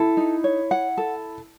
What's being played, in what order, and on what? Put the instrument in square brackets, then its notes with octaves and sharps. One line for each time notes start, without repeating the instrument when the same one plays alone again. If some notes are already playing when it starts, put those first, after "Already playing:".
Already playing: [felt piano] E4 [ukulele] A4
[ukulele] D#4
C#5
F#5
A4